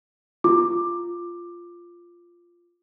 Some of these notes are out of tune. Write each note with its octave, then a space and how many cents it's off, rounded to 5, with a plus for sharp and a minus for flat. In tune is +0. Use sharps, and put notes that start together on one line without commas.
F4 -5 D6 +10